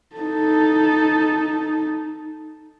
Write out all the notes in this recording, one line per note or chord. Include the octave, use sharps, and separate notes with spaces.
D#4 A4